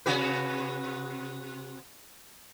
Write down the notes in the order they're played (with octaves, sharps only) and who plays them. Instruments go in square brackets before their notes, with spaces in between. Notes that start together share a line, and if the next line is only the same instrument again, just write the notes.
[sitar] C3 F#4 B4